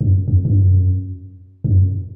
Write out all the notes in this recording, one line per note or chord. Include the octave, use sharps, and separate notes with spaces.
F#2
F2
G2
F#2
F#2